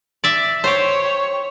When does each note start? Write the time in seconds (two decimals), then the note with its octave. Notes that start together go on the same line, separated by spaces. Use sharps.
0.24 D5 E5
0.64 G4 C5 C#5